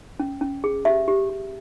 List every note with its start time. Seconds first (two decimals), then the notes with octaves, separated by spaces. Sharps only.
0.20 C#4
0.41 C#4
0.64 G#4
0.85 G4 E5
1.08 G4
1.30 G4